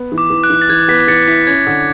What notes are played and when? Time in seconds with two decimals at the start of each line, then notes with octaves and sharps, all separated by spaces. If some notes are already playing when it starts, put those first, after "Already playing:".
Already playing: B3
0.12 E3
0.18 D6
0.30 E3
0.44 F#6
0.50 E3
0.61 A6
0.69 E3 G#6
0.88 B3 B6
1.08 E3 A6 C#7
1.27 E4 B6
1.47 C#4 G#6
1.66 D3